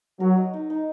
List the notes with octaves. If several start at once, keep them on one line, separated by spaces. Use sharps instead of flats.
F#3 A#4
D#5
D#4
D#4